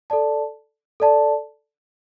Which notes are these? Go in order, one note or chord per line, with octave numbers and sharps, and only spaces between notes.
A4 D5 A5
A4 D5 A5